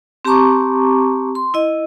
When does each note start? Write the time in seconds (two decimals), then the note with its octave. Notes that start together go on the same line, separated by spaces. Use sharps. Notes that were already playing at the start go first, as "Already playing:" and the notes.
0.25 C4 G4 A5 A#5 C#6 D6
1.35 C6
1.54 E4 D#5